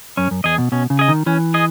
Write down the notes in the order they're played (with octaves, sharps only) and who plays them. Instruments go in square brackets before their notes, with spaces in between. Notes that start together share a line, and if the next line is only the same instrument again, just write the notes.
[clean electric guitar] F#2 [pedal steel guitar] C#4
[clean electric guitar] F#2
[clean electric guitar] E2 [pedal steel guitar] G#4 D#5
[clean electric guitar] B2
[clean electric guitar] B2 [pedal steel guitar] C#4
[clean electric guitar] C#3
[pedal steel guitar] G#4 D#5
[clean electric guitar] D#3
[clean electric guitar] E3 [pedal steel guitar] C#4
[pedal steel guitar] G#4 D#5